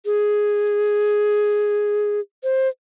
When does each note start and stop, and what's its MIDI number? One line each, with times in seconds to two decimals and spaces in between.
0.06 2.20 68
2.44 2.68 72